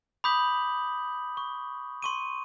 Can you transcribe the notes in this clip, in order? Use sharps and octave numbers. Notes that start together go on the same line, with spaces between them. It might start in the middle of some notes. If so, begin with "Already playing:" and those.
B5 D6 D#6 G6 B6 F#7
C#6
C6 C#6 D#7